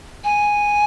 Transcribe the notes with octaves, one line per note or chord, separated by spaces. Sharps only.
G#5